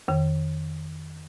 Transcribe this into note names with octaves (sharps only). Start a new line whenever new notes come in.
F2 D#3